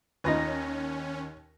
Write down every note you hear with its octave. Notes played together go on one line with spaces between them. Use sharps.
D#2 C#4 D#4 F4 B4 A#6